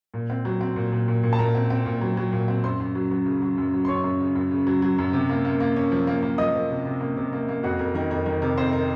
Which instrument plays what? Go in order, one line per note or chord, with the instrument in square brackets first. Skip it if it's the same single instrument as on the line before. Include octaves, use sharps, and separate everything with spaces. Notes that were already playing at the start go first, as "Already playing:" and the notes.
[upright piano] A#2
C4
F#3
C4
A#2
A#2
A#2
A#2
A5
A#2 A#4 A#5
C4
C4
A#2
F#3
F#3
A#2
C4
F#2 C5 C6
F#2
F#3
F#3
C#3
F#3
F#2
F#3
C6
F#2 C#5 C#6
F#2
C#3
F#2
C#3
F#3
F#3
F#2
C3
A#3
A#3
A#3
C#4
F3
A#3
A#3
F3 D#5 D#6
F3
C3
C3
A#3
C3
A#3
A#3
F2 F#4 F#5
F2 A#4
D#3 A#4
F2 A#4
D#3 A#4
C3 A#4
F2 C4 C5
A#4